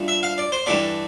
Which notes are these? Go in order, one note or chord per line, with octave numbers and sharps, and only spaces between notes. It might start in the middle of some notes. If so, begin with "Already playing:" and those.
Already playing: G2 F3 A3
E5
F5
D5
C5
G2 E3 A3 D5